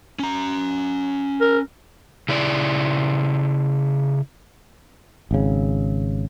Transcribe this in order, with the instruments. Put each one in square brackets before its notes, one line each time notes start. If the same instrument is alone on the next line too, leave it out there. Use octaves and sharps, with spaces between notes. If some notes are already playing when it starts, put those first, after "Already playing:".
[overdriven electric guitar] C#4 A#5
[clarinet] A#4
[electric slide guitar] C#3 E4 D5
[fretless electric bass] G#1 C#3